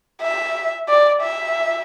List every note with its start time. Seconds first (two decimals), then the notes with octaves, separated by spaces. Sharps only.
0.22 E5
0.88 D5
1.22 E5